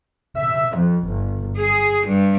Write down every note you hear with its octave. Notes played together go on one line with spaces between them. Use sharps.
E5
F2
G1
G#4
G2